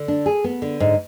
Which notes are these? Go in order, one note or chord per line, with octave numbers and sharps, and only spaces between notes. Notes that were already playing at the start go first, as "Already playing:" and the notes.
Already playing: D3
D4
G#4
B3
D3
G#2